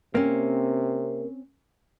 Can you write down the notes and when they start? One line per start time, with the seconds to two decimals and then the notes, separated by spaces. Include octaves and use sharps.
0.15 C3 A#3 C4 C#4